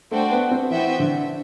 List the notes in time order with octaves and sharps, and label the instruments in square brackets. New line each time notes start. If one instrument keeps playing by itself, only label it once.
[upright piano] A3 [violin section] D4 F#4 C5 G5
[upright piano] B3
C4
[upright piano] E3 [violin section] B3 F#4 C5 E5 G5
[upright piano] D3